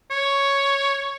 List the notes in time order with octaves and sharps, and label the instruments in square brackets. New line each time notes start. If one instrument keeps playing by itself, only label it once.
[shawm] C#5